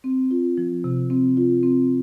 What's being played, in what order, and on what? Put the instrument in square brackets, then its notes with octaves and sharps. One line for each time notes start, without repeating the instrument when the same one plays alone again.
[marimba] C4
F4
F3
C3
C4
F4
C4